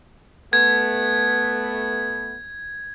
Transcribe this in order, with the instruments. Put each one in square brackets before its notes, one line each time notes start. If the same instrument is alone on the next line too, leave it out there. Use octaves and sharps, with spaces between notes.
[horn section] A3 B3 [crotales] G#6